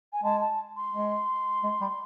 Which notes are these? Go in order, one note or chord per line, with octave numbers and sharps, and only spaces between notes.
G#5
G#3 A5
A5
C6
G#3
G#3
G3